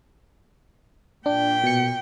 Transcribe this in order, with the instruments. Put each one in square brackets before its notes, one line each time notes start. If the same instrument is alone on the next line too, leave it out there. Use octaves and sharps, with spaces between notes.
[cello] A#2 G5 [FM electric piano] D4
[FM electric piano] B2 C#7